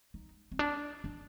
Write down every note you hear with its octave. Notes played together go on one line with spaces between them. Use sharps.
D#4
C4
D4
D4